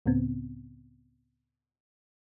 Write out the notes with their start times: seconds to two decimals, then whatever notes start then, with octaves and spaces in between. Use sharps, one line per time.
0.06 C#2 A2 C#3 B3 C4